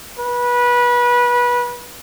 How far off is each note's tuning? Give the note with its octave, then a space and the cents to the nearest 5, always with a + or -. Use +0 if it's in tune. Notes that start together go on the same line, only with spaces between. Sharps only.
B4 -25